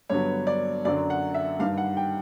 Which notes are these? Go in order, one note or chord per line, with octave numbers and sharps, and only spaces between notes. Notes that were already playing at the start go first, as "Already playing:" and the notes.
G2 D3 F#3 B3 C#5
D5
F#2 D3 F#3 D5
F#5
E5
G2 D#3 G3 F5
F#5
G5